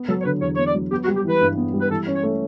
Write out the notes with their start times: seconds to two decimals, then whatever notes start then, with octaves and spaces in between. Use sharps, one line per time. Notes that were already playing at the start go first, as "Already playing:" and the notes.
Already playing: B3
0.08 F#3 A4
0.21 C#5
0.25 D3 B4
0.41 E2 C#5
0.55 B3 C#5
0.66 D5
0.74 F#3
0.91 B3 G4
1.04 F#4
1.08 G3
1.16 G4
1.25 E3 B4
1.41 G2
1.57 B3
1.73 G3
1.81 B4
1.90 E3 A4
2.07 C#4
2.15 C#5
2.23 A3